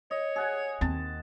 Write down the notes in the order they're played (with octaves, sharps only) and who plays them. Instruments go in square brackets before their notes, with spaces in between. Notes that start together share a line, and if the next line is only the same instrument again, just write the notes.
[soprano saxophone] C#5 [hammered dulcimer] D#5
[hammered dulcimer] G#4 F#5 G#5
[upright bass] D#2 C4 [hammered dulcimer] A5